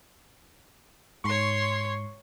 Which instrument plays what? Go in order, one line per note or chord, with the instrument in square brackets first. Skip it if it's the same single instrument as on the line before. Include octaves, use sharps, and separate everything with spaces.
[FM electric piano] G#2 C#6 [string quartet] C#5 C6